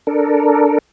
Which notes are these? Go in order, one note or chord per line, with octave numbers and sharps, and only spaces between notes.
D4 A4 A#4